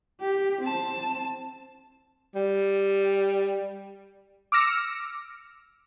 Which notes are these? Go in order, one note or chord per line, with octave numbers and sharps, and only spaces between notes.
G4
C4 A5
G3
D6 E6 F6 A#6 C#7